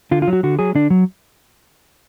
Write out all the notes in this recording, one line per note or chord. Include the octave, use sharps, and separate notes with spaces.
D3 F4
F4
F#3
F#4
D3 F#4
F#3 G#4
D3 D4
F#3